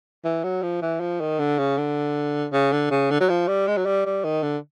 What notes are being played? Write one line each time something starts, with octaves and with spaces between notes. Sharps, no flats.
E3
F#3
F3
E3
F3
D#3
D3
C#3
D3
C#3
D3
C#3
D3
F#3
F3
G3
G#3
F#3
G3
G3
D#3
D3